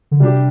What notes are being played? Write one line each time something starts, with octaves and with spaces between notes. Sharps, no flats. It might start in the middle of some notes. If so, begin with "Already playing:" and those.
D3
C3 G3 D4 G4